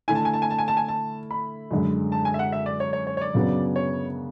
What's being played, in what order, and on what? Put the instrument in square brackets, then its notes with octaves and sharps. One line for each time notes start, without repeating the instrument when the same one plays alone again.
[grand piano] D3 A3 E4 [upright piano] G#5
[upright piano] A5
G#5
A5
G#5
A5
G#5
A5
G#5
A5
B5
[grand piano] F#2 D3 G#3
[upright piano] A5
G#5
E5
F#5
E5
D5
C#5
C#5
C#5
C#5
D5
[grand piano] F#2 C#3 F#3 B3 D4
[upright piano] C#5